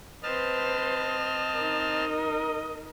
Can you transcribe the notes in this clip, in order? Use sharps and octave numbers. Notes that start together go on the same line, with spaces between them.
C4 B4 C5 D#5 A5 F6
D#4 A#4